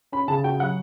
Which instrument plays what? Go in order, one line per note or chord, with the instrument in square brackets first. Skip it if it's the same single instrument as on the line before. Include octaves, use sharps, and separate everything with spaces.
[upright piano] C#4 [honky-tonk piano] B5
[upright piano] C#3 [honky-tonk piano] A5
[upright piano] F#4 [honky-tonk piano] G5
[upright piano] F#3 [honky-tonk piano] F#5